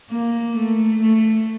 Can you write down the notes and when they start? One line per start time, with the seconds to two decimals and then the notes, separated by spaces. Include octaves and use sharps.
0.11 A#3
0.56 A3
1.01 A3